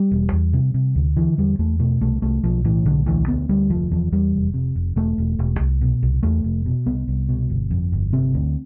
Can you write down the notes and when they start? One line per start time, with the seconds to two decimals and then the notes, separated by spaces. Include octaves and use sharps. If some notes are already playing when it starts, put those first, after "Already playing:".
Already playing: G3
0.11 E1
0.32 E2
0.53 C3
0.74 C3
0.95 D2
1.17 D3 E3
1.38 E2 G3
1.59 E2 A3
1.80 B2 A3
2.01 C2 A3
2.22 C2 A3
2.43 B1 F3
2.65 A2 E3
2.86 B1 D3
3.06 D2 E3
3.27 D2 B3
3.49 D2 G3
3.70 F1 F3
3.91 E2 F3
4.12 E2 G3
4.33 F1
4.54 C3
4.76 F1
4.96 E1 A3
5.18 E1
5.39 E1
5.60 C2
5.81 B2
6.02 C2
6.23 E2 A3
6.44 F1
6.66 B2
6.86 C2 B3
7.08 C2
7.29 B2
7.50 G1
7.71 F2
7.92 G1
8.13 C3 C4
8.34 D2